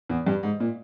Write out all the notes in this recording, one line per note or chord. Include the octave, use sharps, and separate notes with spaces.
E2
G2
G#2
A#2